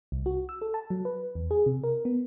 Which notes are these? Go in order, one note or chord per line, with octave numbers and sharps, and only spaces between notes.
C2
F#4
E6
A4
A5
F#3
B4
E2
G#4
C3
A#4
B3